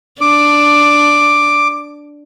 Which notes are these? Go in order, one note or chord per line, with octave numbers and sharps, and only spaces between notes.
D4 D6